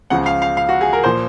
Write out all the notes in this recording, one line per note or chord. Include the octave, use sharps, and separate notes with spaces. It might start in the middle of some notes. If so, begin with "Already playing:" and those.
C#2 C#3 F3 F#5
F5
F5
F5
F#4
G#4
A#4
A#2 F3 C5